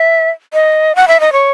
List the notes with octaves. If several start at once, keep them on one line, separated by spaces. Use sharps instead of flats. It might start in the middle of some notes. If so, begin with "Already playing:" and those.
Already playing: E5
D#5
F#5
E5
D#5
C#5